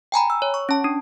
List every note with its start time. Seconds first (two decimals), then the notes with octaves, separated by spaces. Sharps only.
0.12 G5 G#5 A#5 B5
0.30 E6
0.42 C#5
0.54 C#6
0.69 C#4 A5
0.84 D4